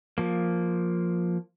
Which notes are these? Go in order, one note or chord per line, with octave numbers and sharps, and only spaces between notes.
F3 A#3